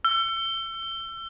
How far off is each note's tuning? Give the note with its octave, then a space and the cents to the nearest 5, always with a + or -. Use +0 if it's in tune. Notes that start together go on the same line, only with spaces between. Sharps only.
E6 +35